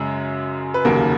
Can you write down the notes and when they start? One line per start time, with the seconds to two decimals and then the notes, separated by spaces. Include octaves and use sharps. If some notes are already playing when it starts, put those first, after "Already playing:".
Already playing: F#2 C#3 G#3
0.74 B4
0.85 F1 D#2 C#3 F#3 A#3 A#4